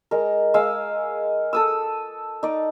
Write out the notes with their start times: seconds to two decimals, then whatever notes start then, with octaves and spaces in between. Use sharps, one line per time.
0.11 G#3 A#4
0.54 G#3 F5 E6
1.53 A4 D#6 E6
2.43 D#4 D5